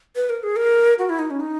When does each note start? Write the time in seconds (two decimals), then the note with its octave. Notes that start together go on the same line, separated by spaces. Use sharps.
0.16 B4
0.30 A#4
0.43 G#4
0.56 A#4
0.99 F#4
1.09 E4
1.19 D#4
1.31 C#4
1.40 D#4